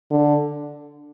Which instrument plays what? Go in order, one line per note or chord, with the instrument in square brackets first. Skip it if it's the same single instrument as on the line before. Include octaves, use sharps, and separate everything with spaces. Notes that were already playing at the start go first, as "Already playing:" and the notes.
[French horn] D3